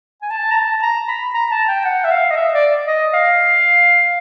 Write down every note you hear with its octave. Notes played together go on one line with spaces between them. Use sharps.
G#5
A5
A#5
A5
A#5
B5
A#5
A5
G5
F#5
E5
F5
D#5
E5
D5
D#5
F5